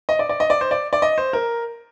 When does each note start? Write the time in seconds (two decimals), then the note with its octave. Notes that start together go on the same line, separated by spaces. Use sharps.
0.09 D#5
0.19 D5
0.29 D5
0.40 D#5
0.50 D5
0.61 C5
0.71 D5
0.93 D5
1.02 D#5
1.18 C5
1.33 A#4